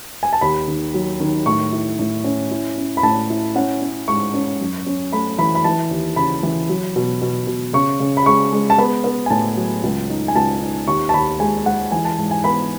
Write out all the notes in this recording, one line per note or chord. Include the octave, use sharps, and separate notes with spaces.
G#5
A5
D#2 B5
D#3
F#3
D#3
A2 C#6
E4
A2
C#4
E4
C#4
B5
A2 A5
E4
C#4 F#5
C#4
G#2 C#6
C#4
F#2
C#4
A3 B5
E3 B5
B5
E3 A5
D#2
C#3 B5
E3
F#3
B2
B2
B2
C#3 C#6
C#3
B5
G#3 C#6
G#3
A5
B3 B5
B3
G#5
A2 A5
F#3
C#2
D#4
G#5
C#2 A5
D#4
D#2 C#6
A5
D#2 B5
G#3 G#5
G#3 F#5
E3 G#5
A5
G#2 A5
G#5
B3 B5